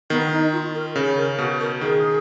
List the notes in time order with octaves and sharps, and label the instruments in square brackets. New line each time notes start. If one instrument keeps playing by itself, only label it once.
[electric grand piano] D#3 [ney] B3
[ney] D#4
F4
A#4
[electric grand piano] C#3
[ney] A#4
[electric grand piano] B2 [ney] F#4
[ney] A#4
[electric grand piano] D#3 [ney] G#4